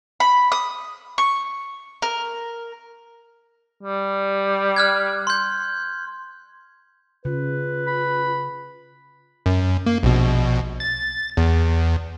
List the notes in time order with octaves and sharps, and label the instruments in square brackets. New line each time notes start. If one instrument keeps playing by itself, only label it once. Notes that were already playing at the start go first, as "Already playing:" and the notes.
[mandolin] B5
D#6
C#6
A#4
[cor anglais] G3
[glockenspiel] F6 F#6 G#6
C6 G6
[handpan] C#3 [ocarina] F4 [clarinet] B4
[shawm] B5
[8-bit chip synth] F#2
A#3
A#1 B2
A6
E2